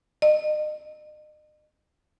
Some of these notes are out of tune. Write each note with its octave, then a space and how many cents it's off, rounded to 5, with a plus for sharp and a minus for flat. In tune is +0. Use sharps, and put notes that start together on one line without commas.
D#5 -40